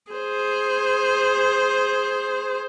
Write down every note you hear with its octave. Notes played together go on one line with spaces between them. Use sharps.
G#4 C5